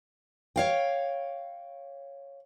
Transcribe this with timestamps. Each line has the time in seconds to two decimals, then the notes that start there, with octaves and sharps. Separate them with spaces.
0.56 C#5 F5 G5